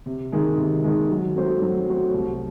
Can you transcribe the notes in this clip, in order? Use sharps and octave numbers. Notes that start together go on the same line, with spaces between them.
C3
D#3 G#3
C3
D#3 G#3
F#3
A3 C4 F#4 C5
F#3
A3 C4 F#4 C5
C2